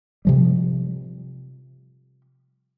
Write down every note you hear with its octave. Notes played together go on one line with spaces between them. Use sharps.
C3 F3 G3